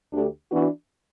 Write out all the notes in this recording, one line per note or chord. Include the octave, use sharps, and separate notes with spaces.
D2 D3 A3 D4 G4
E3 B3 D4 F#4